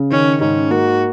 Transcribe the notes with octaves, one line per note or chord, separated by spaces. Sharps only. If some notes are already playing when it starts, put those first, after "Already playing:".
Already playing: C#3
D#3 C#4
G#2 C#4
A#3 F#4